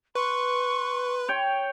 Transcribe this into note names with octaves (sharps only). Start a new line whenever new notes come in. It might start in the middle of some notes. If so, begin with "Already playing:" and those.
B4 C6 C#6
C#5 G5